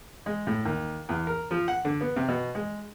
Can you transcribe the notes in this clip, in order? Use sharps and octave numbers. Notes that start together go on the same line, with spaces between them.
G#3
A2
D#2
E2
A#4
F3
F#5
D3
B3
C3
B2
G#3